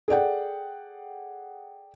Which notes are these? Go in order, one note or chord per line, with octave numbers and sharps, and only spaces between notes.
G#4 A4 D5 F#5 G5